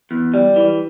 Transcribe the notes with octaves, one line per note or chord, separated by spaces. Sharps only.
E2
G3
E3